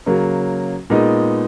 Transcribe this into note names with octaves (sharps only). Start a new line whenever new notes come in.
C#3 F#3 A#3
A#2 G#3 B3 D#4